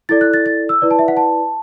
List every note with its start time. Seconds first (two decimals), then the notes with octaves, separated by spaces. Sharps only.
0.09 E4 A4 D5 A6
0.21 F#6
0.34 A6
0.46 A6
0.69 E6
0.82 E4 B4 D5
0.91 A5
0.99 E5
1.08 F#5
1.17 A5